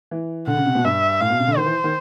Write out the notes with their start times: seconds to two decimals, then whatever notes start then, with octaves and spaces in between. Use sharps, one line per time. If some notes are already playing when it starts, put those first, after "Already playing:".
0.11 E3
0.47 D3 F#5
0.57 C#3
0.66 C3
0.75 B2
0.84 G2 E5
1.21 A2 F5
1.30 B2
1.39 C3
1.47 D3
1.57 D#3 C5
1.65 E3
1.84 D#3